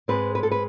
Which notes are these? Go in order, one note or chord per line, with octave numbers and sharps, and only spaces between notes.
G#2 G#3 C4 B4
B4
A4
B4